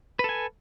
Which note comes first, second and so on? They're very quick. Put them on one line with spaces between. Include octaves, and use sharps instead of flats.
B4 A4 G#5